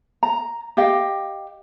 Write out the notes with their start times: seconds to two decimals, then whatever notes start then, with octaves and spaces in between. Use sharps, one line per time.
0.23 A#5
0.77 G4 D#5 F5 G5